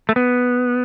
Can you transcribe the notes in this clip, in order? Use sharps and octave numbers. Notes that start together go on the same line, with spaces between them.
A3
B3